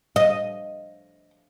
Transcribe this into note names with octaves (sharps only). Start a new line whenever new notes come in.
D#5